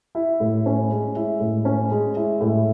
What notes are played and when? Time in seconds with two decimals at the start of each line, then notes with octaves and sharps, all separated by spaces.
0.15 E4
0.40 A2
0.66 C#4
0.91 G#3
1.16 E4
1.40 A2
1.65 C#4
1.91 G#3
2.16 E4
2.41 A2